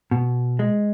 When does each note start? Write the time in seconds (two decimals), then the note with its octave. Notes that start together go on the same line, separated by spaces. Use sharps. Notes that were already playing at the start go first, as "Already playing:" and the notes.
0.11 B2
0.59 G#3